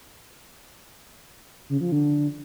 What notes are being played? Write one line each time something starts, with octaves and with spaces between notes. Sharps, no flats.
C#3
F3
D3